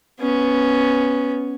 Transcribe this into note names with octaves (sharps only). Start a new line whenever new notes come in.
B3 C#4